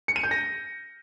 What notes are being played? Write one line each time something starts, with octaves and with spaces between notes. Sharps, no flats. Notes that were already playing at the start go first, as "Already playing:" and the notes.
C#7
D#7
G6
A#6